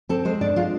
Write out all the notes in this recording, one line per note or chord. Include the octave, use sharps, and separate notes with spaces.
C4 A4
G#3 C5
D4 D5
G#3 F4